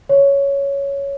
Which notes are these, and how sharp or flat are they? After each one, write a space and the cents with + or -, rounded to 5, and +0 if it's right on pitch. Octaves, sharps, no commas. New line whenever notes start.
C#5 +5